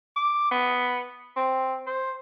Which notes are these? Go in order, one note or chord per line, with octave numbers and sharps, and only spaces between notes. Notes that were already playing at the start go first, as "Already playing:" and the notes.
D6
B3
C4
C5